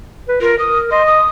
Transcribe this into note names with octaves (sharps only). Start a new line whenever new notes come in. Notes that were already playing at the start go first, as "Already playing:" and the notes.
B4
F4 A#4
A#4 D#6
D#5 C6
D#6